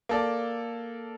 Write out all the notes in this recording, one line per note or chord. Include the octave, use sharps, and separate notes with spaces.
A#3 A4 D5